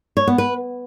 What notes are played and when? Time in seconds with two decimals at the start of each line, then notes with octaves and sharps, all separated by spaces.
0.17 C#5
0.27 B3
0.38 B4